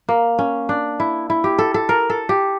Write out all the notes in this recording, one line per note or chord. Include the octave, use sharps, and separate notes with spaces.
A#3
C#4
D4
E4
E4
G4
A4
A4
A#4
A4
G4